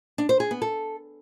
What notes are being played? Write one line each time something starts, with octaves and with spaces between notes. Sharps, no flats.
D4
C5
G#4
B3
A4